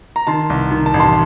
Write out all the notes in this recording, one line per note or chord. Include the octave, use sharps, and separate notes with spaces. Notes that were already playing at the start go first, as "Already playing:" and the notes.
A#5
D#3 A5 C6
C2
D#3
A5
A1
A5 C6